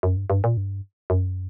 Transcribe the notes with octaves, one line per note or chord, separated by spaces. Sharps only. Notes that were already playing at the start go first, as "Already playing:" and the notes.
F#2
G2
G2
A#2
G2
F#2